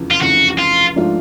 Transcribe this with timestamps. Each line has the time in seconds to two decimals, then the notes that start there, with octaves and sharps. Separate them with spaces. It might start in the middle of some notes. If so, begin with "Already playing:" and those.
Already playing: F1 E2 C#3 F3
0.11 F4
0.21 F1 E2 C#3 F3 F#4
0.59 F4
0.96 G#2 F3 A3 D4 F4